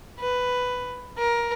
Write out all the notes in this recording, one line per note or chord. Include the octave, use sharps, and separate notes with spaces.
B4
A#4